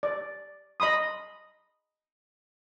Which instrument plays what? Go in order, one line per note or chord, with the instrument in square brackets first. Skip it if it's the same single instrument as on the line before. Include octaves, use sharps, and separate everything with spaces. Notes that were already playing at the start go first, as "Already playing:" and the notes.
[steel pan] D5
D#5 B5 C6 D#6